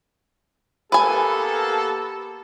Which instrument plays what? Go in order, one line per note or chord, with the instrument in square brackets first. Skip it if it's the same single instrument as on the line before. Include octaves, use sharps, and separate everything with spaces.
[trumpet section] A#3 B3 A4 [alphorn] G4 [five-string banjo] B4 G#5